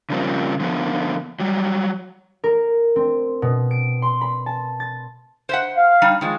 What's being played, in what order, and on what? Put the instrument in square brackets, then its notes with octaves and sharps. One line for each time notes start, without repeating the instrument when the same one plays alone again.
[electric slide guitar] C#3 F3 G3 A#3 C4
D3 F3 A#3 B3
F#3 G3
[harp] A#4
C4
B2
D7
C6
B5
A5
A6
[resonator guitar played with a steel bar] C5 E5 F#5
[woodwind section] F5
[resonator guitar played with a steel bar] G3 D#4
[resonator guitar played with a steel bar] D#3 F3 [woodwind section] G#3